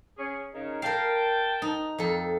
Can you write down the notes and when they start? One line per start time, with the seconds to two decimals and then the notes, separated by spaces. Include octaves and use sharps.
0.18 C#4 G#4
0.53 C#3 D#4 A#4
0.82 A#4 F5 G5 A5
1.62 D#4
1.98 F2 A4